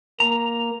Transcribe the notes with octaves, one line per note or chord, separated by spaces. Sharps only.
A#3 A#5